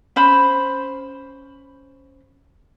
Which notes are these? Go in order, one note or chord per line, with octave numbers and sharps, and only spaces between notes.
C#4 C5 B5